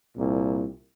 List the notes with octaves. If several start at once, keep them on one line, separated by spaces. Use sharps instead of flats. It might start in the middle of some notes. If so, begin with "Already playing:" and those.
C2 A#2